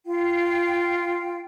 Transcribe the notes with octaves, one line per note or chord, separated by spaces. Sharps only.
F4 F5 G5